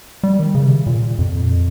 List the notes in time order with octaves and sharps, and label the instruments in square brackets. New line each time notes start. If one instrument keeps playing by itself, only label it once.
[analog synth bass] G3
D#3
C#3
C3
A#2
F2